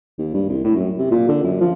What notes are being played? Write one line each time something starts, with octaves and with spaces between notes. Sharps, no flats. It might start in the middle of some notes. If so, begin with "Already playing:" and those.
D#2
G2
C2
A2
F#2
C3
A#2
D3
F#2
F3